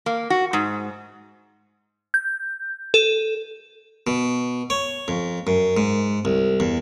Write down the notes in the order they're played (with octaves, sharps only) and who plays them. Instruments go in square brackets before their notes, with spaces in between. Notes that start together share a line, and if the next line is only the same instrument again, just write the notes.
[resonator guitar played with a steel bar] A#3
F#4
G#2
[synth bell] G6
A4
[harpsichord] B2
C#5
F2
F#2
G#2
C2
E2